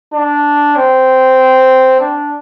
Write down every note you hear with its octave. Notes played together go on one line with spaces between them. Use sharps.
D4
C4
D4